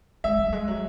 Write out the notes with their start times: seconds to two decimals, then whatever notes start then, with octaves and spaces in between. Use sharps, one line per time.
0.24 G#3 E5
0.38 G3
0.52 G#3
0.68 F#3